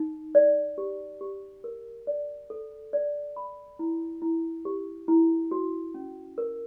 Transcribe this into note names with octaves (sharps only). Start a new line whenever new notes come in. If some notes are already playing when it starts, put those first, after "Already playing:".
Already playing: D#4
D5
G4
G4
A#4
D5
A4
D5
B5
E4
E4
G4
E4
F#4
C#4
A#4